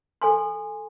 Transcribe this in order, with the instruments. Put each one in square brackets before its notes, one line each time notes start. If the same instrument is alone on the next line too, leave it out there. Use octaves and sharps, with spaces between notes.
[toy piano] A4 G#5 C6